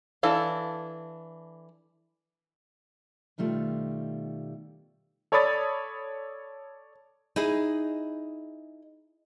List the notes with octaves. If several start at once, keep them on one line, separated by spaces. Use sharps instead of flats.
E3 D4 A4 F5
B2 D#3 G3 A3 F4
A4 C#5 D5 B5 D#6 A6
D#4 E4 G#4